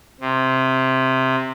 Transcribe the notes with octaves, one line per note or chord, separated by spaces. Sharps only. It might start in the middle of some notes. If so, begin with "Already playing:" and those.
C3